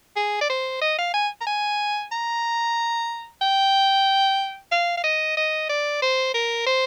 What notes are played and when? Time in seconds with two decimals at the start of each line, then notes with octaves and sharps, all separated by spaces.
0.16 G#4
0.41 D5
0.50 C5
0.82 D#5
0.98 F5
1.14 G#5
1.41 A#5
1.47 G#5
2.12 A#5
3.42 G5
4.72 F5
4.97 F5
5.04 D#5
5.37 D#5
5.69 D5
6.02 C5
6.34 A#4
6.66 C5